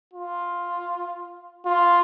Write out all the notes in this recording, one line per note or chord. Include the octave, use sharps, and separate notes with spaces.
F4
F4